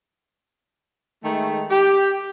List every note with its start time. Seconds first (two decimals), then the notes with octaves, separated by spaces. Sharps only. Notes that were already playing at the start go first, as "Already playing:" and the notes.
1.24 D#3 G#3 A3
1.71 G4